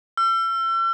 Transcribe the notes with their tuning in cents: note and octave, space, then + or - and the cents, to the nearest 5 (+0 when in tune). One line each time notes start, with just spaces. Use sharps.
E6 +40